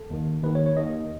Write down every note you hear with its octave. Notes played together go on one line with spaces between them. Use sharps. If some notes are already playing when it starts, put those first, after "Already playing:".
Already playing: A4
D#2 D#3
D#2 D#3 B4
C#5
C#5
D#2 D#3 D#5